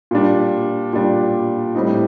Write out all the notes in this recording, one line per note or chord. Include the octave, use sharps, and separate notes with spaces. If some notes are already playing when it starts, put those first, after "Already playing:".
A#2 G3 D4
A#2 G3 D4
A2 G3 C4 D#4